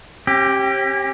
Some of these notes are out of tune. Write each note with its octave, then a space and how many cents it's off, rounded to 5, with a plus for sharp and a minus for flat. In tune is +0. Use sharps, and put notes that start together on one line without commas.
C#4 -40 G4 +0